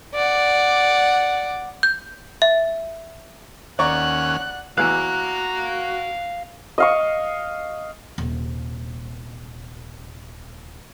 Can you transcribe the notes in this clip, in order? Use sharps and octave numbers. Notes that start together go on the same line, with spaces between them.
D5 F#5
G6
E5
D#2 C#4 D5 F#5 A#5 C#6 F#6
E2 E3 F#4 F5 A#5 F#6
D#5 F5 C#6
D#1 C3